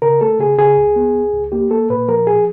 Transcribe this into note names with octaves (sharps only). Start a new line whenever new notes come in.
C#3 A#4
A3 A4
C#3 G#4
C#3 G#4
C#2
B3
C#2
C#2
A#3 G4
A#3 A4
A#2 B4
F3 A#4
G#4